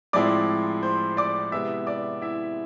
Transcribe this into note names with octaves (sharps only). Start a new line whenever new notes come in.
A2 F3 G#3 C4 E4 D5 D6
C5 C6
D5 D6
C3 G#3 B3 E4 E5 E6
D5 D6
E4 E5